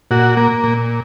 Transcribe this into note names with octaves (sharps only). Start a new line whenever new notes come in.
A#2 F#4
A#3
A#2